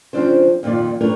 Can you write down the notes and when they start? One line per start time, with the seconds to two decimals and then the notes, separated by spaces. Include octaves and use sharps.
0.13 C#3 E3 F3 C4 D4 C5
0.63 F2 A#2 D#3 F4 D5
1.01 A3 D4 G4 A#4 B4 C#5